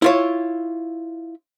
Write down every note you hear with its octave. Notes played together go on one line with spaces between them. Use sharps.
E4 F4 C#5